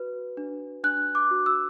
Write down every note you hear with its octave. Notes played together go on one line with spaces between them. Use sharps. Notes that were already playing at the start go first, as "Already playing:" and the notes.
Already playing: F#4 B4
D4
D4 F#6
D6
F#4
E6